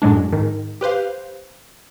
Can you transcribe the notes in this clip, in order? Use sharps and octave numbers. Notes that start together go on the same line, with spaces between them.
F#2 A2 F#3 G#3 D4
G#2 D#3
G4 B4 C5 F5